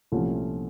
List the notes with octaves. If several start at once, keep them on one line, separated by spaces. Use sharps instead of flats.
C2 A#2 F3 A3 C#4